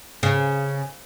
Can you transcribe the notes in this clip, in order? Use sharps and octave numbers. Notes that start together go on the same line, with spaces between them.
C#3